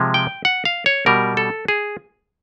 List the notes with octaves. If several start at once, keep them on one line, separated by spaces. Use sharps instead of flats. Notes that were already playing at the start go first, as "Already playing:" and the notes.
Already playing: C3 F3 G#3
G5
F#5
F5
C#5
B2 G3 A#4
A4
G#4